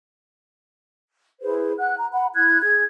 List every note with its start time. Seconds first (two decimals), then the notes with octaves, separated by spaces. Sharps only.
1.42 E4 G#4 B4 C5
1.78 F#5 F#6
1.97 A#5
2.12 F#5 B5
2.35 E4 F#6 G#6
2.62 G#4 G#6